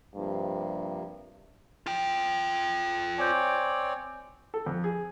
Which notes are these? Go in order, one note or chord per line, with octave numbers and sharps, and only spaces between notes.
G2 C3 F3 A#3
F4 G5
C4 C#5 D5 G#5 G6
A4
F2
G#4